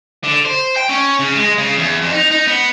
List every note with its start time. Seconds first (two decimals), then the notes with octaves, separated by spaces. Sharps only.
0.24 D3
0.45 C5
0.76 G5
0.89 C#4
1.20 C#3
1.36 G#3
1.58 C#3
1.78 E2
2.02 F2
2.13 D#4
2.31 D#4
2.48 B3